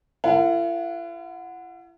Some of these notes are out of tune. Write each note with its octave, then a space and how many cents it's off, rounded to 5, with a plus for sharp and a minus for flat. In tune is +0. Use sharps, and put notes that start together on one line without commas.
E4 +45 A#4 -40 F#5 -15